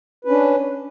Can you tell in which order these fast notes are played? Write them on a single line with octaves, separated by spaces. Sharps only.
B4 C#4 D4